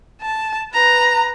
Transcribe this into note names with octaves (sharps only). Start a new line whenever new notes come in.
A5
B4 A#5